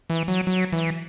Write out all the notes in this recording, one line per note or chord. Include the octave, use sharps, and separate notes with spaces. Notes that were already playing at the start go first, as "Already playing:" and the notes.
E3
F#3
F#3
E3